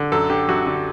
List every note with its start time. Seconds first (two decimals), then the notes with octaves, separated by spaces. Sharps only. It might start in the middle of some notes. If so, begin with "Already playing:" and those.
Already playing: D3
0.12 F#2 A4
0.30 D3 G4
0.48 F#2 F#4
0.67 D3